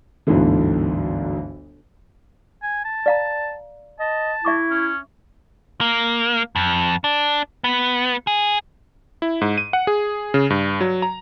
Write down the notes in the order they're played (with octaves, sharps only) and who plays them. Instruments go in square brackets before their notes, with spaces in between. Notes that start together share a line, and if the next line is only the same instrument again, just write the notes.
[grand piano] G1 D2 G#2 B2 D3 E3
[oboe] G#5
A5
[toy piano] D5 F5 A#5
[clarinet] D#5 [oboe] A5
[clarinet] E4 [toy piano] E5 C#6 D6
[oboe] C#4
[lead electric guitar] A#3
F2
D4
B3
G#4
[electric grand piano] E4
G#2
D#7
F#5
G#4
C#3
G2
F#3
A#5